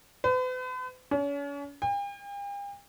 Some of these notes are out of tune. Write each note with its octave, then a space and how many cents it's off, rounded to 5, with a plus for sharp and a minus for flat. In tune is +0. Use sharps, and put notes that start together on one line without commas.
B4 +45
C#4 +40
G5 +45